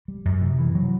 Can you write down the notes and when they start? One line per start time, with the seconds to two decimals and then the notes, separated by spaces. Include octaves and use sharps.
0.08 G3
0.25 F#2
0.41 C3
0.59 E3
0.75 F#3